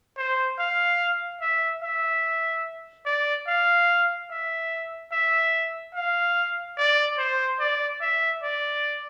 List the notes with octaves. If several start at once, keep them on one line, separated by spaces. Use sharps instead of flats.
C5
F5
E5
E5
D5
F5
E5
E5
F5
D5
C5
D5
E5
D5